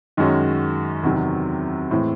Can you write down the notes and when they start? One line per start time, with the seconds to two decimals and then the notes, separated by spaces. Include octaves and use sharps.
0.17 F#2 D#3 G#3 C#4 F#4
1.03 E2 C3 D#3 F#3
1.91 A2 E3 G#3 C4